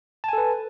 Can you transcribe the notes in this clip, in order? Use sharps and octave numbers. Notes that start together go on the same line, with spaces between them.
A4 B4 G#5 A5